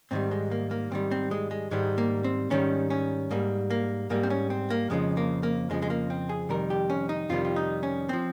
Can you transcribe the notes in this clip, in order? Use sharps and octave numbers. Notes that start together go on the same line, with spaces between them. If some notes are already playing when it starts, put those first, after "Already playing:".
G#2 D#3 G3 C4
G#3
A#3
A#3
G#2 D#3 G3 C4
C4
G#3
G#3
G#2 D#3 G3 G#3
A#3
C4
G#2 D#3 G3 C#4
C#4
G#2 G3 A#3
A#3
G#2 G3 A#3
C4
C#4
C4
A#3
F2 C#3 F3 G#3
A#3
A#3
F2 C#3 F3 G#3
G#3
A#3
C4
G#4
F2 C3 D#3 G3 A#4
G4
C#4
D#4
F2 C3 D#3 G3 F4
F4
D#4
C#4
F3 C4